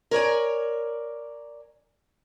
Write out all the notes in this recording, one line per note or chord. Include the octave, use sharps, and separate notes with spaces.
A#4 C#5 D5 G#5